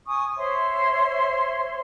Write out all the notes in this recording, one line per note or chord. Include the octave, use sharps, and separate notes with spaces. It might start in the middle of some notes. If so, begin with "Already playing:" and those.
G#5 C#6 D#6
C5 C#5 E5 C6